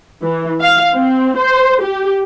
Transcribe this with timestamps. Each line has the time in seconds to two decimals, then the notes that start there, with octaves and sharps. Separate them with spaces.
0.24 E3
0.61 F5
0.94 C4
1.38 C5
1.83 G4